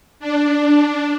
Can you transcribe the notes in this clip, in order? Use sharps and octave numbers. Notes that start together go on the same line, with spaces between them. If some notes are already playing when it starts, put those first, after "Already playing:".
D4